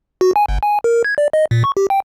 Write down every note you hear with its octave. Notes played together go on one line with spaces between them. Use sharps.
F#4
G#5
G1
G#5
A#4
G#6
D5
D#5
A#2
C#6
G4
G5